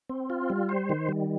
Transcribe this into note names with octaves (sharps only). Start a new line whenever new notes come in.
C4
F4
G3
C5
D#3
G3